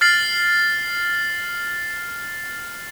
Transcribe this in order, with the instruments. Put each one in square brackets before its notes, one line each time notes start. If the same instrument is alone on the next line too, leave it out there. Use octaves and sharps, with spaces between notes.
[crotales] F6 A6 C7 F#7